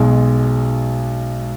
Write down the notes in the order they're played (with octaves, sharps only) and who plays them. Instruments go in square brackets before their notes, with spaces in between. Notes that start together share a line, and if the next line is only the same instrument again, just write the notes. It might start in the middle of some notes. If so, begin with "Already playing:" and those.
Already playing: [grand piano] B1 B2 G#3